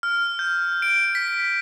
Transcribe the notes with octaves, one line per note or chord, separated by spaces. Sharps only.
F6
G6
D7
B6